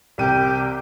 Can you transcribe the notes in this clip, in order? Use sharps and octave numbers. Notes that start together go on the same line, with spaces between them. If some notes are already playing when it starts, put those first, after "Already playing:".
C2 C3 G4 D#7